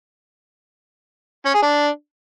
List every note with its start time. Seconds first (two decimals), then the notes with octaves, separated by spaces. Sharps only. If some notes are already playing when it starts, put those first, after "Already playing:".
1.46 C#4
1.54 G#4
1.63 D4